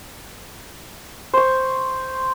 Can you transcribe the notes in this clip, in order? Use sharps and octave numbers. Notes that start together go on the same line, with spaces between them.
C5 C#6